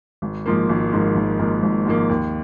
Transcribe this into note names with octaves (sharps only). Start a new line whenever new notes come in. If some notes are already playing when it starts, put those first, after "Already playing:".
G#1
G#2 F3 A#3
G#1
G#2 F3 A#3
G#1
G#2 F3 A#3
G#1
G#2 F3 A#3
D#2